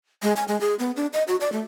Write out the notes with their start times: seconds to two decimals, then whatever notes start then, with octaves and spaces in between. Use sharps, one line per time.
0.23 G#3
0.37 G#5
0.48 G#3
0.61 G#4
0.79 B3
0.96 D4
1.13 D#5
1.28 F#4
1.41 D5
1.52 A3